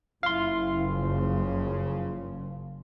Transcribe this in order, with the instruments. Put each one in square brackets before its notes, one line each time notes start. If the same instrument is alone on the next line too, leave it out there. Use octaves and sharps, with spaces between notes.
[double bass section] F#1 [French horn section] E4 [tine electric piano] F5 C6
[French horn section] C#3 F3